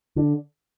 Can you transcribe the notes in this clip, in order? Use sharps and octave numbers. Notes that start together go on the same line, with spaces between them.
D3